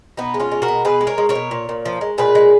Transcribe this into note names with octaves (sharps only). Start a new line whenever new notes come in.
B2 B3 D#4
G#3
C#4 F4
G#3
F#4 A#4
B2
B2 G#4 B4
G#3
A#4 C#5
G#3
A#4 C#5
B2
A#2
A#2
F3
G#3
A#2 G#4 B4
G#3